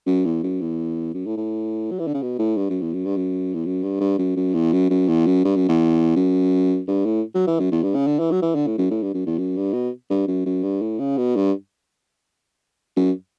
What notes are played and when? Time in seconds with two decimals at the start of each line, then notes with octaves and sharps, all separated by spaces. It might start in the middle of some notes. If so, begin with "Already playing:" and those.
0.06 F#2
0.25 E2
0.43 F#2
0.61 E2
1.14 F#2
1.26 A2
1.37 A2
1.91 F#3
1.99 E3
2.07 D3
2.14 C#3
2.22 B2
2.39 A2
2.57 G2
2.70 F#2
2.81 E2
2.93 F#2
3.05 G2
3.16 F#2
3.54 E2
3.65 F#2
3.83 G2
4.01 G2
4.18 F#2
4.36 F#2
4.54 E2
4.73 F#2
4.90 F#2
5.08 E2
5.26 F#2
5.44 G2
5.56 F#2
5.68 E2
6.16 F#2
6.88 G2
7.05 A2
7.35 F#3
7.47 E3
7.59 F#2
7.72 E2
7.83 G2
7.95 C#3
8.07 D3
8.19 E3
8.31 F#3
8.42 E3
8.55 D3
8.67 A2
8.78 F#2
8.90 A2
9.03 G2
9.14 F#2
9.26 E2
9.38 F#2
9.57 G2
9.73 B2
10.10 G2
10.28 F#2
10.46 F#2
10.63 G2
10.81 A2
10.99 C#3
11.18 B2
11.36 G2
12.96 F#2